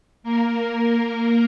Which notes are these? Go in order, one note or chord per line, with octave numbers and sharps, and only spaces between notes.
A#3 A#4